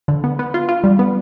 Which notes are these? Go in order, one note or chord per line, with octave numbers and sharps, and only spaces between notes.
D3
B3
B3
F4
F4
G3
B3